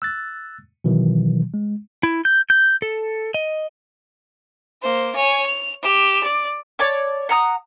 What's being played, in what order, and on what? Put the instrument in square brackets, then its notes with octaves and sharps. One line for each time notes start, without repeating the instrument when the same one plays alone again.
[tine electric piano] E6 F#6 A6
B2 D#3 E3 F#3
G#3
[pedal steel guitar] E4
G6
G6
A4
D#5
[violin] A#3 C5
C#5 G#5
F7
G4 E7
D5
[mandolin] C#5 D5 A5 D6
F#5 A#5 D#6